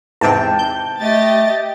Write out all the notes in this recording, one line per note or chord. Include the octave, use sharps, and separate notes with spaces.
E2 G#2 C3 G5 A5
G6
A3 G4 D#5 A6